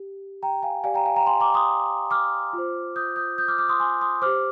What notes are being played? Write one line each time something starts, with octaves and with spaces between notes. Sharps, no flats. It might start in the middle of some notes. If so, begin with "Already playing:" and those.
Already playing: G4
G5 A#5
F5 G#5
G4 D5 F5 G#5
G5 A#5
F5 G#5
G5 A#5
G#5 C6
A#5 D6
C6 D#6
D6 F6
F4 C5
D#6 G6
D#6 G6
D#6 G6
D6 F6
D6 F6
C6 D#6
G#5 C6
C6 D#6
G4 C5 D6 F6